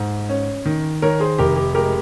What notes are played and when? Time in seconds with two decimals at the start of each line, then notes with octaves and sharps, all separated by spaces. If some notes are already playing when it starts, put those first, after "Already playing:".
Already playing: G#2
0.29 C#4
0.65 D#3
1.02 D#3 A#4 C#5
1.20 G#4 C5
1.38 F1 G4 A#4
1.56 G4
1.74 G#3 G4 A#4